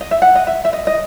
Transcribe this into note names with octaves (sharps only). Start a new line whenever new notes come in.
D#5
E5
F#5
D#5
E5
E5
D#5
D#5